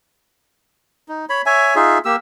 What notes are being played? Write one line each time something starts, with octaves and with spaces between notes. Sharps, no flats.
D#4
C#5 B5
C#5 E5 G#5
D#4 F4 G#4 E5
A#3 G4 E6